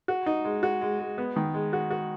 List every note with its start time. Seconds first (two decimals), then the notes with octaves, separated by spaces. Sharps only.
0.08 F#4
0.26 D#4
0.45 G#3
0.63 F#4
0.81 G#3
0.99 G#3
1.18 B3
1.36 D#3
1.54 G#3
1.73 F#4
1.91 F#4